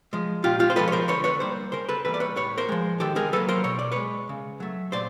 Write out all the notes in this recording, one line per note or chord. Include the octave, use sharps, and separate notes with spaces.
F3 G#3
A#2 F4 G4
F4 G4
C5
F3 G#3 A4 B4
C#5
A#4 C5
D3 B4 C#5
B4 C#5
G3 A#3 C5 D5
C#3 A#4 C5
A4 B4
E3 G3 A#3 A4 B4
D5
B4 C#5
A2 B4 C#5
A#4 C5
F3 G#3
D#3 G4 A4
G#4 A#4
F#3 A#3 A4 B4
A#4 C5
B2 C#5
D5
G#3 B4 C#5
C#3
F#3 A3
A#2 C5 D5